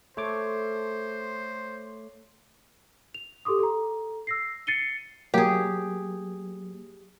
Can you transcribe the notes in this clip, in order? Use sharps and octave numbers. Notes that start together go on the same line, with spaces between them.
A3 A4 C5 C#5 D6
F7
G4 A4 C6 D6 D#6
A4 A#5
E6 A#6 C7
A6 C7 C#7 D#7 G7
F#3 A#3 G4 G#4